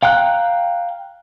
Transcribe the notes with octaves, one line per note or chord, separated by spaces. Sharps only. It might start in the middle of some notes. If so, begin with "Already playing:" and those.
F5 G5 A#5 F#6